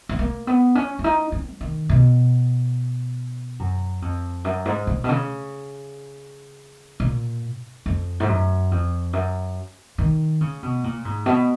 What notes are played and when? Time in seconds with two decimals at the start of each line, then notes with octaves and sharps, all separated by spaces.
0.09 B3
0.19 A#3
0.47 B3
0.75 C#4
0.99 C#4
1.04 D#4
1.32 C#4
1.50 F3
1.61 D#3
1.89 B2
3.59 F#2
4.02 F2
4.44 F#2
4.65 G#2
4.87 A#2
5.04 B2
5.09 C#3
7.00 A#2
7.86 F2
8.20 G#2
8.28 F#2
8.71 F2
9.13 F#2
9.98 D#3
10.41 C#3
10.63 B2
10.84 A#2
11.05 G#2
11.26 B2